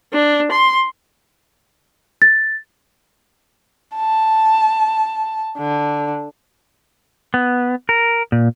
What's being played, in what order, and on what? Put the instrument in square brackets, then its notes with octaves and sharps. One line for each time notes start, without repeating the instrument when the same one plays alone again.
[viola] D4
C6
[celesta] A6
[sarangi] A5
D3
[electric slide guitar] B3
A#4
A#2